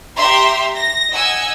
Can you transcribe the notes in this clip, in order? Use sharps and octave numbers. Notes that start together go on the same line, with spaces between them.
G4 E5 A#5 C6
A#6
D#5 F#5 G#5 E6